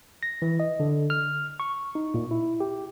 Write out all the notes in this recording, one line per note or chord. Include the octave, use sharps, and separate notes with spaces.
A#6
E3
D#5
D3
F6
C#6
D#4
A#2
E4
G4